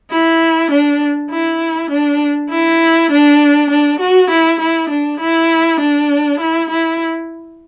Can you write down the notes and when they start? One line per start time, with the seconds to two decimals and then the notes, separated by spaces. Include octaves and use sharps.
0.11 E4
0.71 D4
1.31 E4
1.91 D4
2.50 E4
3.11 D4
3.71 D4
4.00 F#4
4.31 E4
4.60 E4
4.90 D4
5.20 E4
5.80 D4
6.40 E4
6.70 E4